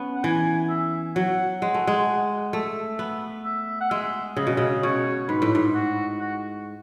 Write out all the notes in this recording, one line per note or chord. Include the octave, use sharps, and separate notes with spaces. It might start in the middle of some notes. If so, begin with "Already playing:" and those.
Already playing: B3 C#4
F#5
E3 G#5
E5
F#3 F#5
G#3 F#5
A3
G#3
A3 E5
B3
E5
F#5
G#3 E5
C#3 D#5
B2
C#3
B2 C#5
G#2 B4
A2
G#2
F#4
F#4